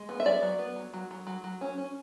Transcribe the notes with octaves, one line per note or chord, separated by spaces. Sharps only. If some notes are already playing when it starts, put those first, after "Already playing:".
Already playing: G#3
B3
E5
F#3 D5
F#3
B3
F#3
F#3
F#3
F#3
F#3
C#4
C#4